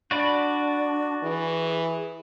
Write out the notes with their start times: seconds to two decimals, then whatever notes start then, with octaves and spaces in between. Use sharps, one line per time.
0.11 D4 F#4 D5 B5
1.23 E3 G#4